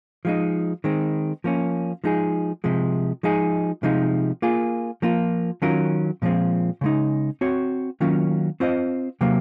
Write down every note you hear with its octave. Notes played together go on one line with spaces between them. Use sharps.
F3 G#3 D#4
D#3 G#3 C4
F3 A#3 C#4
F3 G#3 D#4 G#4
C3 F3 G#3
F3 G#3 D#4 G#4
C3 F3 G#3 D#4
A#3 F4 G#4
F3 A#3 F4
D#3 F#3 C#4 F4 A#4
A#2 F3 G#3 C4
C#3 G#3 D#4
C4 F#4 C#5
D#3 F#3 A#3 C#4 F4
C4 F4 C5 D#5
C3 F#3 A#3